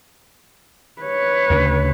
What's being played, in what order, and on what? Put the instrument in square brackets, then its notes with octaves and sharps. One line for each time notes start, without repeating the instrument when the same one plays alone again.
[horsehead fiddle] B4 C#5
[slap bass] D2 C#3